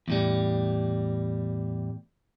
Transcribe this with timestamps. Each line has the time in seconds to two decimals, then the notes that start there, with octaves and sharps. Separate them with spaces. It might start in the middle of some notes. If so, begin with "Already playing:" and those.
0.08 E2 A2 G3